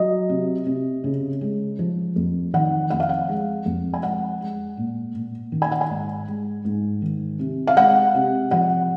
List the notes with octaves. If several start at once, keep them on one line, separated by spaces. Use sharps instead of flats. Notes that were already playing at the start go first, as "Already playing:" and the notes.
Already playing: F#3 D#5
C3
C3
C#3
G#3
F3
F2
D#3 F#5
F2 F#5
F5
F#5
G#3
F2
G#5
G#3 F#5
G#3
A#2
A#2
D#3
G#5
F#5
G#5
G#2
G#3
G#2
D#3
C3
F5
G#3 F#5
C3
F3 F#5